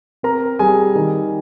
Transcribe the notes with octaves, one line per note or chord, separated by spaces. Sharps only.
C4 A#4 A#5
G3 G#4 G#5
D#3